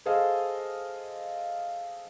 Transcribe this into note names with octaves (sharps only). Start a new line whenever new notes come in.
G#4 A4 C5 D#5 F5